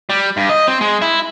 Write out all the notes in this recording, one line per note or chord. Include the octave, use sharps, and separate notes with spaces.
G3
G2
D#5
C4
G#3
E4